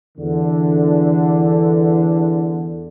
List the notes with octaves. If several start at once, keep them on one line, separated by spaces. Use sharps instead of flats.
E2 D3